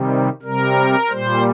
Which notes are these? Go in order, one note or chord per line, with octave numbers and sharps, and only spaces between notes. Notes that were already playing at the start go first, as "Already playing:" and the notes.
Already playing: C3 D#3 G3
C3 G3 A#4
A#2 G3 C5